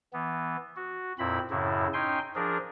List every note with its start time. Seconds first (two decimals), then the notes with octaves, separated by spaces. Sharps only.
0.13 E3 B3
0.76 F#4
1.19 F2 A#2 C4 E4 B5
1.51 F#2 A2 C#3 E4
1.94 C#4 D#4 G5 G#5 C6
2.35 F3 D4 G#4 A#4